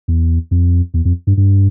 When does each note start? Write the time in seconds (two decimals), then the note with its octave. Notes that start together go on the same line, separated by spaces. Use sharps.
0.08 E2
0.51 F2
0.94 E2
1.05 F2
1.27 G2
1.37 G2